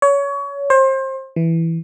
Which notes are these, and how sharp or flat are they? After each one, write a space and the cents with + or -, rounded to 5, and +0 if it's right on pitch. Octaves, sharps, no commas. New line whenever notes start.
C#5 +25
C5 +30
E3 +0